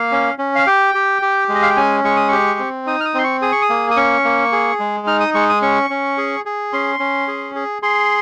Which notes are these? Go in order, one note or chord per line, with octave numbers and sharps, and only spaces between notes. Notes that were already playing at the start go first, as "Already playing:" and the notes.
Already playing: A#3 F5
C#4
C#4
F5
G4 G5
G4
G4
G#3
D#5
F5
G5
C#4 G#5
G#3 C#6
D#6
G4 C#6
C4
D#4 D#6
F6
D#6
C4 C6
C#6
G#4 D#6
C#6
D#6
A#3
D#6
C#4 C#6
A#3
G#4
G#3
D#4 F6
D#6
G#3 C#6
D#6
C#4 C#6
C#4
G#4
G#4
C#4 C6
C#4
G#4
G#4
G#4 C6